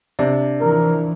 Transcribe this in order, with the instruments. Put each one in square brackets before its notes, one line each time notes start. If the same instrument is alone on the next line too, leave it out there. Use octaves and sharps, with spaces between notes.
[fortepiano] C3 [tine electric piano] D4 D5
[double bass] E3 F3 [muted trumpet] A#4